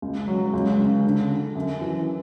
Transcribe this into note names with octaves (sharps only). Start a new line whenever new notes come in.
C#2
F#3
C#2
C#3
D3
D3
F#2
E3